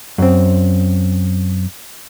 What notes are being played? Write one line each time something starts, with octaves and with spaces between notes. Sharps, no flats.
F#2 C4